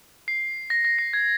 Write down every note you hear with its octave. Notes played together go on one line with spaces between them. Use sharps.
C7
A#6
A#6
C7
G#6